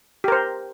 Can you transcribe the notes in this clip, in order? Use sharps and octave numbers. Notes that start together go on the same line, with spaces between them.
G4 A#4 C5